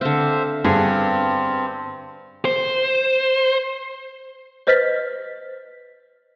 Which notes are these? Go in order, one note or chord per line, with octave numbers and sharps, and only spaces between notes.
D3 C4 C5 E5 F5
G2 B3 C4 G#4
C5
B4 C5 D#5 F6 A6 B6